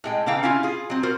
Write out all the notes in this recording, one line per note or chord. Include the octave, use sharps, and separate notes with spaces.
A2 G#3 G5
C#3 E3 E4 F5 G5 A#5
C#3 C#4 E4 F4 F5
F4 G#4
F#3 C4
F4 F#4 A#4 C5